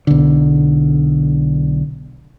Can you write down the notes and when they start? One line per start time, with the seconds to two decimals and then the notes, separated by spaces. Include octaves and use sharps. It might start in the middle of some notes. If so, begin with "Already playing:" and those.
0.07 B1 D3